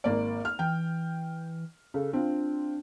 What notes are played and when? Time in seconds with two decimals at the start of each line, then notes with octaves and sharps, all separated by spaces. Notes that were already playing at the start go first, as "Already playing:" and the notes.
0.04 G#1 A#3 D5
0.45 F6
0.59 E3 G5
1.94 C#3 A4
2.13 C4 D4 F4